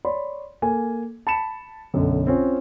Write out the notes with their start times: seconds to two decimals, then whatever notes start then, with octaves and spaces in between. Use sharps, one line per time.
0.05 C#5 D5 B5 C6
0.62 A#3 A4 G#5
1.27 A5 B5 C#7 E7
1.94 B1 F#2 D3
2.27 C4 C#4 F4